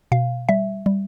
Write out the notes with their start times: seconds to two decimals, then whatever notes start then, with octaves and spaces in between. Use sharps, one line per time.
0.12 B2 F5
0.49 G3 E5
0.86 G3